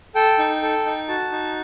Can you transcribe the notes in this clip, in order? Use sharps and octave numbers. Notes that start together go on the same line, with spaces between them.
A4 G5
D#4
A4
D#4
F#4 A5
D#4